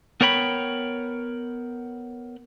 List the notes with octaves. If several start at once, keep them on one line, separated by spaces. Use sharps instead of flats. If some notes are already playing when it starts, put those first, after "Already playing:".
B3 A#4 C#5 G5 B5